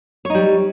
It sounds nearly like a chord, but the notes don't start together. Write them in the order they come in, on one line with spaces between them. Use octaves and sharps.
C#5 D#4 G3